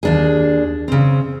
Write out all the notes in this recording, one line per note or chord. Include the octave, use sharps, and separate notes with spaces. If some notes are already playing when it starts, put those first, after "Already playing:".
D#2 D4 G#4
C#3 C4